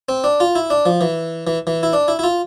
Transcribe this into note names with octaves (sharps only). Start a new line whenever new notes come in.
C4
D4
F4
E4
D4
F3
E3
E3
E3
E4
D4
E4
E4
F4